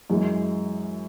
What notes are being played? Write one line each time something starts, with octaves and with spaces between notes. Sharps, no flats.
F#2 E3 G#3